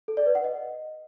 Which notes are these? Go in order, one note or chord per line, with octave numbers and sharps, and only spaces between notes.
A4
D5
B4
F#5
D#5